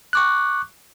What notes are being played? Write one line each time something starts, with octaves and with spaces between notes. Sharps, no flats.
C#6 D6 F#6